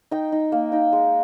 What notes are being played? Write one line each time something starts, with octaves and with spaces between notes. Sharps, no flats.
D#4 G5
D#4
A#3
D#4 G5
G#3